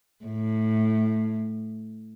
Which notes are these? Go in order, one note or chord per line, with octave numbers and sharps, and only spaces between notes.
A2